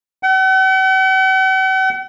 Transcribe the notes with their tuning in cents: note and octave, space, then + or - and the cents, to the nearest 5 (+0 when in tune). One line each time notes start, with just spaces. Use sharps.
F#5 +45